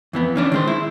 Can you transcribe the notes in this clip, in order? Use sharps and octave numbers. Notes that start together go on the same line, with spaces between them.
F2 E3 B3
E3 C#4 D4
D#3 G#3 C5
E4